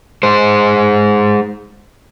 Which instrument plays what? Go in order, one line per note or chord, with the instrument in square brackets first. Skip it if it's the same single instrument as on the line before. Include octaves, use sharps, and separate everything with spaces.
[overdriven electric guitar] G#3 C5